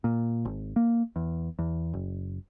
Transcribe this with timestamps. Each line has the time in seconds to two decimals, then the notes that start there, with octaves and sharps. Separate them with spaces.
0.04 A#2
0.45 G#1
0.76 A#3
1.16 E2
1.59 E2
1.93 F#1